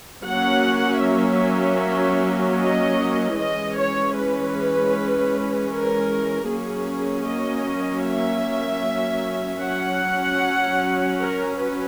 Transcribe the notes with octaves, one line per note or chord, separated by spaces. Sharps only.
F#3 A#3 C#4 F#5
E5
D#5
E3 G#3 C#4 D#5
C#5
B4
A#4
F#3 A#3 C#4 G#4
D#5
E5
F#3 C#4 F#5
A#4
B4